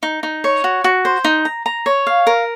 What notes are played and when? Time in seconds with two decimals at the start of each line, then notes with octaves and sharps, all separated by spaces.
0.03 D#4
0.23 D#4
0.44 C#5
0.64 F#4
0.84 F#4
1.05 C5
1.25 D#4
1.45 A#5
1.66 A#5
1.86 C#5
2.07 F5
2.27 A#4